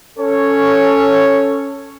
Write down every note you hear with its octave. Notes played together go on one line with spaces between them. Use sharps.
C#4 A4 C#5